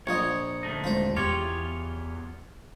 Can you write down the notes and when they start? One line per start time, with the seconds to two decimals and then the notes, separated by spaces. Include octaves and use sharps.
0.07 A#1 F4 C#5 D#5
0.63 D2 A3 D#4
0.84 D#1 G#3 F4 C5
1.17 E2 F4 G4 C#5